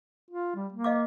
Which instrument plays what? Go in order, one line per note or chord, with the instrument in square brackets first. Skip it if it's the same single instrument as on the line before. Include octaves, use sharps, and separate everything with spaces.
[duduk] F4
G3
A#3
[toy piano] D#5 F5 D6